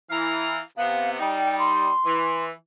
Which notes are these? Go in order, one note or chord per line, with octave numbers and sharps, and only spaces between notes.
E3 E4 F5 A#5
C3 B3 F5
G3 D#4 G5
C6
E3